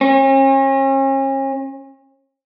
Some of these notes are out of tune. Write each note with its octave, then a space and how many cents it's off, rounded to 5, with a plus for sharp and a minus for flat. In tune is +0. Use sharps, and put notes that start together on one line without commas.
C#4 -40